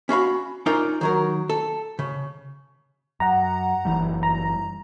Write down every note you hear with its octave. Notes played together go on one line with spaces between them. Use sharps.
C#4 F#4 F5 B5
C#4 D#4 F4 A#4 D5
D#3 F#3 A#4
A4
C#3
F#2 F#5 A#5
F#1 E3 G3
A#5